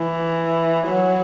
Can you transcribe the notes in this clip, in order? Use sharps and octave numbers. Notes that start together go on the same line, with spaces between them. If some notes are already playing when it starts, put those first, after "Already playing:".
Already playing: E3
F#3